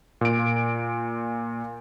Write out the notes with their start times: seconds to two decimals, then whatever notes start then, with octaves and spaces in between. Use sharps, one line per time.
0.21 A#2 D7